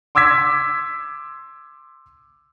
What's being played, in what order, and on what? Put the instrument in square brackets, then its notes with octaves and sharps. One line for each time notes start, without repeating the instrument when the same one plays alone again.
[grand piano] C6 D6 E6 G#6 B6